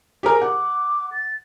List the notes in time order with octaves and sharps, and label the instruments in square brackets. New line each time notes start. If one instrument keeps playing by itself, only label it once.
[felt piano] G4 G#4 A#4
[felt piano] F#5 [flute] D6
[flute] A6